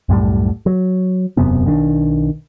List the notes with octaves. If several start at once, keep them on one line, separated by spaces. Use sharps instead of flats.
C2 F#2 A2 G3
F#3
E1 F#2 C3 B3
B1 D#3 C#4 D4